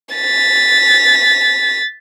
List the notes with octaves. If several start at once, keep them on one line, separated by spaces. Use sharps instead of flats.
A6 B6